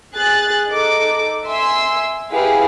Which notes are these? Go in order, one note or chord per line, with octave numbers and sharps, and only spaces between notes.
G#4 F#6 A6
D#4 A4 D6
E5 G#5 C6 E6
E4 G4 G#4 B4 F5